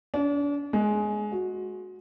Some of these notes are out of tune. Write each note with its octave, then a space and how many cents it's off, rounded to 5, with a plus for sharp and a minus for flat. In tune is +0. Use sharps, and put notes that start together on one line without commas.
D4 -40
G#3 +15
F#4 -10